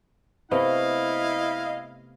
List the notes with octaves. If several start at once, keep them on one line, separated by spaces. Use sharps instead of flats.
C3 A3 B3 E4 D#5 F5